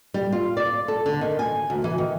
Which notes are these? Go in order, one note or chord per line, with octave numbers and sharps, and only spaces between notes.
G3
F4
D5
A4
D3
D#3
G#5
D2
E3
D#3